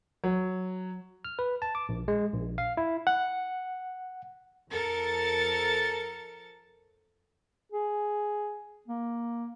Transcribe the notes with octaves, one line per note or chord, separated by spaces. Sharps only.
F#3
F6
B4
A5
D6
A#1
G#3
A#1
F5
E4
F#5
F2 A4 A#4 A6 C#7
G#4
A#3